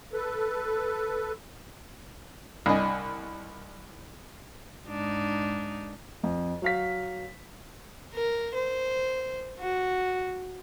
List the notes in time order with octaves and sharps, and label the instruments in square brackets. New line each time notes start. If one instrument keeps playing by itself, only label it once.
[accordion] A4 B4
[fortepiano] C2 D4 D#5 G#5
[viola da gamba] G#2 D4 D#4
[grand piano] F2
F#3 F5 B6
[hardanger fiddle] A#4
C5
F#4